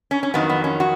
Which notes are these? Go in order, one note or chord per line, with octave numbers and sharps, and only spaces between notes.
C#4
C#4
F2 D#3 F#3 B3
B3
C#4
F#4